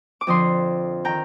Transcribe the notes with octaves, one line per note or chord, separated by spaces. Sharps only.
D6
F2 D3 F3 C6 D#6
D#3 G5 A#5